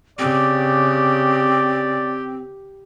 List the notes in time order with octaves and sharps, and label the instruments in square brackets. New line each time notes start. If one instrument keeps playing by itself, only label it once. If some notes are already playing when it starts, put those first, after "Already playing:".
[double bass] C#3 [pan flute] C4 [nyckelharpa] G4 [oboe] D5